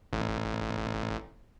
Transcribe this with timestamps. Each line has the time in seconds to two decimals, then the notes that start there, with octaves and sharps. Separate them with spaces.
0.13 A1